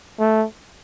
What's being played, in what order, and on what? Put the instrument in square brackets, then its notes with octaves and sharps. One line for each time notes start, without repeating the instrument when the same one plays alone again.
[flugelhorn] A3